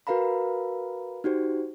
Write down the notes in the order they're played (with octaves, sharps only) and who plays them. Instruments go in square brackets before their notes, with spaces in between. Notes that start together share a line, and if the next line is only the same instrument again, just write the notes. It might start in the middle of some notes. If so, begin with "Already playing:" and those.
[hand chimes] F#4 A#4 B4 F5 A#5 B5
D#4 F#4 G4 C5